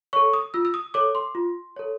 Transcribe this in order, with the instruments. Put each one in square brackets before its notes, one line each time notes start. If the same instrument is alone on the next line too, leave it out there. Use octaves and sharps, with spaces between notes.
[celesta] A4 C#5 C#6
D#6
F4 E6
E6
D#6
A4 C#5 D6
C6
F4
A4 C#5